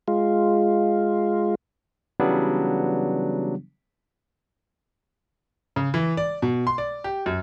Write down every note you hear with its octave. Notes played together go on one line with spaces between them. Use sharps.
G#3 F4
C#3 E3 F#3 G3 B3 D4
C#3
E3
D5
B2
C6
D5
G4
F#2